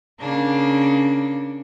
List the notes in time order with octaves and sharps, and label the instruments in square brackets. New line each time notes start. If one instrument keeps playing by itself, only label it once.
[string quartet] C#3 A#3 D4